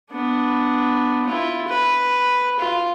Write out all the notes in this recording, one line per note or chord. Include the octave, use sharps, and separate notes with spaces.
B3 D4
E4 F4
B4
F4